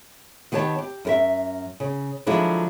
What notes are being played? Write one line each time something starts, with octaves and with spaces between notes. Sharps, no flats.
D#3 B3 G4 C#5 A5
G4
F#2 A#4 E5
C#3
D3 F3 F#3 G#3 D4 E4